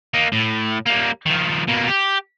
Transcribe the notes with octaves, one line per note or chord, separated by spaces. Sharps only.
A#3 D#4
A2
G3 A#3
D#3 F3
B2 A#3
G4